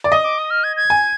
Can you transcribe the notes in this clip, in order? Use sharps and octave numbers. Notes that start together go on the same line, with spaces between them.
D5
D#5 D#6
D6
D#6
F6
G#6
G#6
G#5